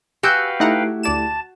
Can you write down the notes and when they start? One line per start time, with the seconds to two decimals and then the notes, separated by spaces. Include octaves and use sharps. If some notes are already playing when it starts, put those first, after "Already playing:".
0.23 F#4 G4 B4 F5 G5 G#5 E6 G6
0.60 A3 D#4 E4 G4 F#5 A#5
1.03 D2 D5 A5 E7